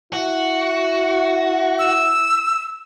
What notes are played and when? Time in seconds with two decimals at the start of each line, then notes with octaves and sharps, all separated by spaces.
0.13 E4 F#4
1.79 E6